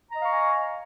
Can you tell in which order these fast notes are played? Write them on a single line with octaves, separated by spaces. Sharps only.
A#5 D#5 F5 C#6 G#5